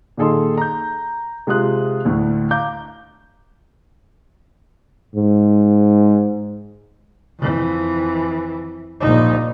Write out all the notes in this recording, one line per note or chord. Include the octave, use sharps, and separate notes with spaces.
A#2 D#3 G#4 A4 D#5 C6
A#5 G6
C3 G#3 F4 D#6 F#6
D2 A2
F5 A#5 D6 G6
G#2
F2 E3
A#1 D#4